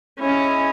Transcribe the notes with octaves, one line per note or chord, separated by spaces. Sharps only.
C#4 E4 G#4 D#5